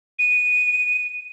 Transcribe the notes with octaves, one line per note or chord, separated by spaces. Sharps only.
D#7